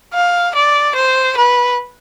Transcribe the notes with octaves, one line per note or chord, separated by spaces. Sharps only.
F5
D5
C5
B4